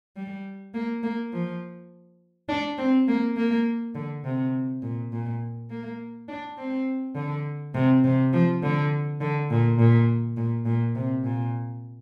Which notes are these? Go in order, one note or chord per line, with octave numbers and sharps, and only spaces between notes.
G3
A#3
A#3
F3
D4
C4
A#3
A#3
D3
C3
A#2
A#2
A#3
D4
C4
D3
C3
C3
F3
D3
D3
A#2
A#2
A#2
A#2
C3
A#2